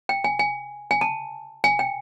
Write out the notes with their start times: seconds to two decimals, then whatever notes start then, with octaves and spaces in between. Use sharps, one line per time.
0.09 G5
0.24 G#5
0.39 G#5
0.91 G#5
1.01 A5
1.64 G#5
1.79 G5